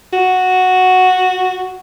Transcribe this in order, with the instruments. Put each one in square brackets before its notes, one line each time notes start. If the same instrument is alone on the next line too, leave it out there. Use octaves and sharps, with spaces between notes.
[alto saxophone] F#4